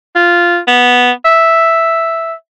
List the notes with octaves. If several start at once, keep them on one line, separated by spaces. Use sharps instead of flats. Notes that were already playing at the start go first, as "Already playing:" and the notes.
F4
B3
E5